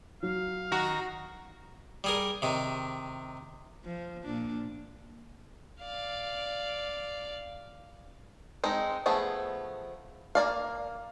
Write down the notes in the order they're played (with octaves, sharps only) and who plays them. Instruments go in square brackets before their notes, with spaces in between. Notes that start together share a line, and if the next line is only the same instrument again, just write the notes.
[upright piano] F#3 [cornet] F5
[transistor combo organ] D#3 A#5 [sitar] F#4
[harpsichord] G3 G#4 A#4
C3 D#3
[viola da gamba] F3
A#2 D4
[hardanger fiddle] D5 F5
[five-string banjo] G#3 C4 D#4
F3 A3 B3 G#4
A#3 D5 F5